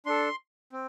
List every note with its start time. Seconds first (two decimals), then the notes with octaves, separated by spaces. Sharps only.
0.06 D4 A4 C6
0.73 C4